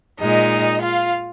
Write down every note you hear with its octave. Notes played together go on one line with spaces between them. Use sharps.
A#2 G#3 D#4 D#5
F4 F5